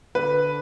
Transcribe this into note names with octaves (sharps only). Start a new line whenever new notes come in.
D3 B4